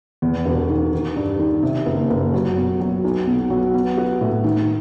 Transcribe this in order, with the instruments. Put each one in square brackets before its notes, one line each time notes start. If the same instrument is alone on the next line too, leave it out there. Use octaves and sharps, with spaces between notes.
[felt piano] E2
E1
D#3
D#3
G2
D#3
C3
F#1
F#1
F#3
B2
F#3
B1
B2
F#3
B3
F#4
A2
D#3